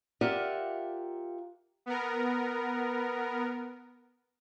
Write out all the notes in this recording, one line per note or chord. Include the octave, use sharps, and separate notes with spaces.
F4 G4 A#4 D5 E5 F#5
B3 A#4